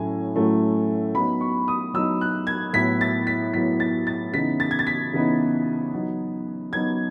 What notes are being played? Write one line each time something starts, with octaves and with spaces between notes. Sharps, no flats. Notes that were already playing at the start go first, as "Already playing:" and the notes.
Already playing: A2 F#3 A3 C#4 E4 G#5
A2 F#3 A3 C#4 E4
F#3 B3 D#4 B5
C#6
D#6
F#3 B3 D#4 E6
F#6
G#6
A2 F#3 B3 E4 B6
A6
B6
A2 F#3 B3 E4 B6
A6
A6
C#3 E3 B3 D#4 B6
A6
G#6
A6
B6
C#3 E3 B3 D#4
F#3 B3 D#4
F#3 B3 D#4 G#6